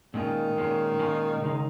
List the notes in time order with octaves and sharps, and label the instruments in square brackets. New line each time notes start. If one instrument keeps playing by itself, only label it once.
[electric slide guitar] A#2 G#3 C#4 F4 [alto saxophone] D#3
[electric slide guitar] A#2 G#3 C#4 F4
A#2 G#3 C#4 F4
C#3 G#3 D#4